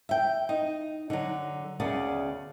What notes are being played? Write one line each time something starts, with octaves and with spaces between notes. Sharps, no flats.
E5 G5
D#4
D3 F#3
D2 C#3 B3 D5